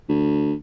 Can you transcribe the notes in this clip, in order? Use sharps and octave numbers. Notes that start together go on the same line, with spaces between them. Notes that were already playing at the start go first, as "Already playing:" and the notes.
D2